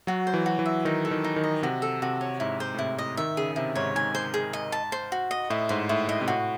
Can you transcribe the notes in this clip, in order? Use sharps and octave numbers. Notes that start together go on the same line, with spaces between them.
F#3 F#4
C5
E3
F#4
E3
E5
D#3 D#4
A4
D#3
D#4
D#3
D#5
C3 F#4
A4
C3 F#4
C#5
G#2 E4
C5
A2
C3 E4
D#5
D#3 E5
C#3 G#4
C3 E4
G#2 C#5
G#2 G#5
C5
G#4
D#5
A5
C5
F#4
D#5
A2 E4
G#2 C5
A2 E4
A2 D#5
C3
A2 F#4